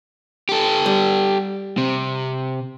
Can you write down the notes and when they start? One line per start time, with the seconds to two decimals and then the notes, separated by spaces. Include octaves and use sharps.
0.49 G4 A4
0.86 G3
1.78 C3